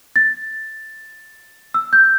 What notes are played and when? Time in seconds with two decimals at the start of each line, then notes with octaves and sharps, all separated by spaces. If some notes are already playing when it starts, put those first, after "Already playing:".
0.16 A6
1.74 E6
1.93 G6